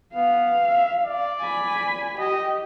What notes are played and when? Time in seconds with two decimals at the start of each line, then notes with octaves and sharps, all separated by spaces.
0.13 B3 F5
0.68 E5
1.04 D5
1.41 G#5 B5
2.19 G4 D#5